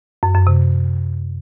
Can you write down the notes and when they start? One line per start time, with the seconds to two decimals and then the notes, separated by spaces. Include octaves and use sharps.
0.23 F#2
0.35 F#2
0.47 C3